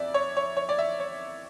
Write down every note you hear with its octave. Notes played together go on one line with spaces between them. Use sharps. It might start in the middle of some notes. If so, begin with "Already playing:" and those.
Already playing: F2 D5 E5
C#5
C#5
C#5
D5
E5
C#5